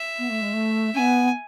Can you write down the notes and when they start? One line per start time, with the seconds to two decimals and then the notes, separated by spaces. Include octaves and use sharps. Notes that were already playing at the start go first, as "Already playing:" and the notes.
Already playing: E5
0.19 B3
0.30 A3
0.42 G#3
0.53 A3
0.95 B3 C#4 G#5